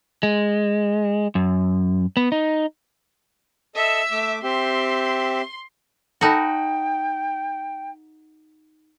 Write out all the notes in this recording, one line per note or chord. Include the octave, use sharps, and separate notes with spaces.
G#3
F#2
B3
D#4
A4 D#5 E5 E6
A3 D6
C4 G4 E5 C6
D#4 F#4 A4 G5 A5 B5